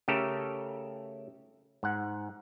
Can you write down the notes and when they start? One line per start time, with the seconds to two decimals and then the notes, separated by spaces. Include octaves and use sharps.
0.08 C#3 A3 G4 A4 A#4
1.83 G#2 F#5